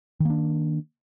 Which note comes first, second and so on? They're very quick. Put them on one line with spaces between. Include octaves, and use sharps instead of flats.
D#3 A#3 D4